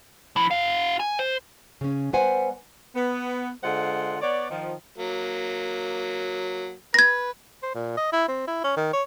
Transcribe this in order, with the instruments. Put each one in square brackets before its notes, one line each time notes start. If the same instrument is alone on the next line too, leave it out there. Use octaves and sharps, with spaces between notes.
[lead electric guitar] F3 E4
F#4 F5
G#5
C5
[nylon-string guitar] C#3 C#4
G3 B3 B4 C5 F#5 G#5
[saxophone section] B3
D3 G#3 F4 C5 F#5
B3 C#5 D5
D#3 F3
[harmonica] F#3 A#3
[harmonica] B4 [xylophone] G#6 A#6
[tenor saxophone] C5
A#2
D#5
E4
C4
E4
C#4
D#3
C#5